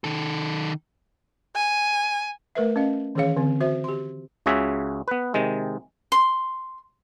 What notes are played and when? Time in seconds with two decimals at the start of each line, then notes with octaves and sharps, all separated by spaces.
0.04 D#3 A4
1.56 G#5
2.55 A3 A#4 B4 E5
2.76 C#4 D#5 F5
3.15 D#3 E3 C#4 G#4 C#5 F5
3.37 D3 C4
3.60 F#4 C5 E5
3.84 G4 C6
4.46 C#2 C#3 F#4 G#4 E5
5.08 B3 B4
5.34 C3 D#3 G#3
6.12 C6